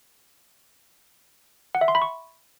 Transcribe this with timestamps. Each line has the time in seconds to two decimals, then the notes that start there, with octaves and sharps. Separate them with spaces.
1.75 F#5
1.81 E5
1.88 C6
1.95 B5
2.02 C#6